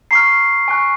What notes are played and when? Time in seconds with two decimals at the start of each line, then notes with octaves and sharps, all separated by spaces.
0.11 A#5 C#6 F6 C7
0.68 G#5 C#6 F#6